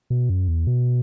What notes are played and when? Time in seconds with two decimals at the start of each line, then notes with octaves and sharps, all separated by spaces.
0.10 B2
0.30 F#2
0.48 E2
0.67 B2